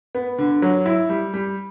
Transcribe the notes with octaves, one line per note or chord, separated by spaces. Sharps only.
B3
D3
F#3
E4
G3
G3